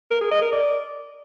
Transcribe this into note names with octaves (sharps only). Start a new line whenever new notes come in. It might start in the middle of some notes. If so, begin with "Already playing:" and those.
A#4
G#4
D#5
A#4
D5